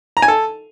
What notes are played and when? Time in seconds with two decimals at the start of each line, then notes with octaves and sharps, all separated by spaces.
0.17 A#5
0.22 G#5
0.28 A4